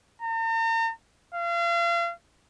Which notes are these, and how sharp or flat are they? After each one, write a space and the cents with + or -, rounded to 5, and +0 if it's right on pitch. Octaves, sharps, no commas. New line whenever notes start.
A#5 -45
F5 -35